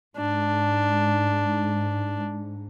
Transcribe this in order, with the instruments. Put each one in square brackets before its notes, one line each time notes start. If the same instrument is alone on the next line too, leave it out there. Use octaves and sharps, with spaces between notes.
[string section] G#2 [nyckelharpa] D4